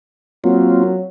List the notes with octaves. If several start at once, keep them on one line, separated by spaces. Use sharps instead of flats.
F#3 A#3 C4 F4